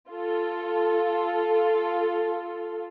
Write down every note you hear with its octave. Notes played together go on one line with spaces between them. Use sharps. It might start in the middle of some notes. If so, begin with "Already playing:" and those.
F4 A4